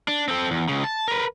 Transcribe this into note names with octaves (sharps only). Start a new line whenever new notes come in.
D4
C4 A4
E2
C#2 C#3
A5
A#4 B4